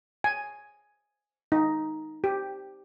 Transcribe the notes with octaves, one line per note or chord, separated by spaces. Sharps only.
G#5
D#4
G4